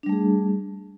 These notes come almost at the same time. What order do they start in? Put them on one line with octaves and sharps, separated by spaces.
D4 G3 A3 G#4